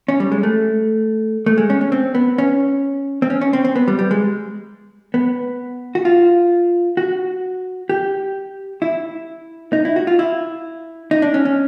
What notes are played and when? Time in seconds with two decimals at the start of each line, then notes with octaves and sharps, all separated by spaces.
0.08 C#4
0.20 G3
0.32 G#3
0.43 A3
1.46 A3
1.58 G#3
1.70 C#4
1.81 C#4
1.92 C4
2.15 B3
2.38 C#4
3.22 C4
3.30 C#4
3.41 C#4
3.53 C4
3.65 C4
3.75 B3
3.88 G3
3.99 G3
4.11 G#3
5.14 B3
5.95 F#4
6.05 F4
6.97 F#4
7.89 G4
8.82 E4
9.73 D#4
9.85 E4
9.96 F#4
10.07 F4
10.19 E4
11.11 D#4
11.22 D4
11.34 C#4
11.45 C#4